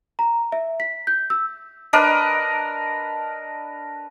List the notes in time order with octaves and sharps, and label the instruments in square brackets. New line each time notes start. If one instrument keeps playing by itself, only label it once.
[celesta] A#5
E5
B6
G6
E6
[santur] D4 A#4 B4 D#5